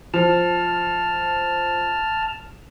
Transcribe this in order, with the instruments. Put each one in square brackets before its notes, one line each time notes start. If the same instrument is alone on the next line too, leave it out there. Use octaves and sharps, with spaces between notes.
[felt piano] F3 [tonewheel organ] A5 F6